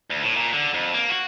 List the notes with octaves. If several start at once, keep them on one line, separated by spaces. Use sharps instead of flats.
D2
A2
A#2
D3
F2
A#3
F#4